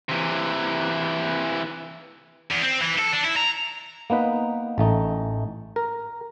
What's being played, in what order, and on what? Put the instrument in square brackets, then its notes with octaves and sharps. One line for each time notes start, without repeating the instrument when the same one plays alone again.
[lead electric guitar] C3 E3
[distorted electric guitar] E2
C4
E3
A4
D4
E4
A#5
[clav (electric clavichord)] A#3 B3 D#4 B4
A1 A3 D#4
A#4